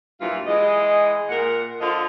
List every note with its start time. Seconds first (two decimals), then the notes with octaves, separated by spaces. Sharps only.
0.20 G2 A#2 E3 F#3 E4 F4
0.47 E3 G#3 D#5
1.29 A#2 A#4 F#5
1.80 D3 F3 F4 A4 D#5